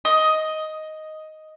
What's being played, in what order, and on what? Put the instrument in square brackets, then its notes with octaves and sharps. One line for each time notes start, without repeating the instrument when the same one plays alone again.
[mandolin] D#5